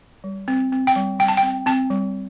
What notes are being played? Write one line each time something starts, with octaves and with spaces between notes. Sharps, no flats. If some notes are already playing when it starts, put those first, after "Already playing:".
G3
C4
C4
G5
G3
G3 G5
A5
G5
C4
C4 A5
G3